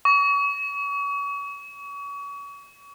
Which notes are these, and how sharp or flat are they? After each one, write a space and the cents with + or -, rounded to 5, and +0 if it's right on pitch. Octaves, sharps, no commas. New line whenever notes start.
C#6 +35